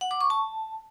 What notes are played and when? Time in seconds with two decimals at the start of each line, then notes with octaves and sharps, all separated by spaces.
0.01 F#5
0.11 D6
0.21 C#6
0.30 A5